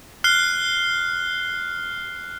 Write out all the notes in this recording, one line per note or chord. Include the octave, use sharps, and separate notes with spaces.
F6 F#6 C7 G7